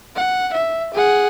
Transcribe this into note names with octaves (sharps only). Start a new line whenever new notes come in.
F#5
E5
G#4 F#5